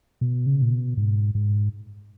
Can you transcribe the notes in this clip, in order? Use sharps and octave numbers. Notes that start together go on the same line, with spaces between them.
B2
C#3
A#2
B2
G#2
G#2